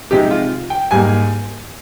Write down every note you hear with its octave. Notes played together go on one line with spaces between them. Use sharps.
C3 F3 G#3 D#4 G4
F4
G5
G#2 G3 A#3 G#5